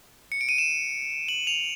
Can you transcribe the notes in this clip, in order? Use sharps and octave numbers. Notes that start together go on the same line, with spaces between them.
C#7
D7
D#7
E7
F#7
F7